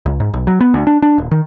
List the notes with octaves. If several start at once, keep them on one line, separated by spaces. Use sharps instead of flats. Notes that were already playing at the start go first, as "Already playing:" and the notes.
C#2
G#2
B1
F#3
B3
D2
D4
D4
D#1
D#3